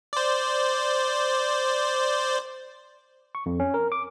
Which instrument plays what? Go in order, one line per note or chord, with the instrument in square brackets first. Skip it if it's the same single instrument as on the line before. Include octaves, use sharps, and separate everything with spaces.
[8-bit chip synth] C5 D5
[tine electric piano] C#6
F2
C#4
A#4
D6